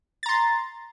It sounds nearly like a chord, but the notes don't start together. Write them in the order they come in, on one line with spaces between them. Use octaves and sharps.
A6 A#5 C6